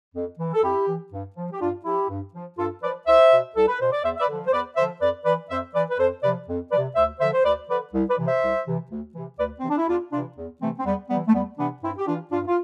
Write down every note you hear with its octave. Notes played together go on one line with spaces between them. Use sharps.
F2
E3
A4
F2 E4 G4
E3
G2
F3
G4
G2 D4 F4
F3 E4 G4
G2
F3
G2 F4 A4
F3 B4 D5
C2 C5 E5
B2
C2 A4
B4
B2 C5
D5
E2 C5 E5
E5
B4 D5
D3 F3
C5
E2 B4 D5
D3 F3 C5 E5
F2 B4 D5
E3 B4 D5
F2 C5 E5
E3 B4 D5
B4
F2 A4 C5
C3 F3 B4 D5
F2
C3 F3 B4 D5
D2 C5 E5
D3 F3 C5 E5
C5
D2 B4 D5
D3 F3 B4 D5
C2
B4 D5
C3 E3
C5 E5
C2
C3 E3
D2
C3 E3
D2 B4 D5
C3 E3 C4
D4
E4
E2 D4 F4
C3 E3 D4 F4
E2
C3 E3 A3 C4
C4
E2 G3 B3
C3 E3 G3 B3
A3
E2 G3 B3
C3 E3 B3 D4
G2 C4 E4
G4
E3 D4 F4
G2 D4 F4
F4